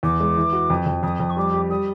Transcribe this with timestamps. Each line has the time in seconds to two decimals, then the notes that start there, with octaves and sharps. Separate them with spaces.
0.03 E2 D6
0.20 G#3
0.37 E3
0.53 F#4
0.70 F2
0.86 F2
1.03 F2 D#6
1.20 F2
1.29 C#6
1.37 G3 D6
1.53 G4
1.70 G3 D#6